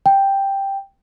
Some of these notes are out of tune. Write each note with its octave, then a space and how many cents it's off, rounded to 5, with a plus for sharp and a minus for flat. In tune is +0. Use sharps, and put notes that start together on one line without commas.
G5 +0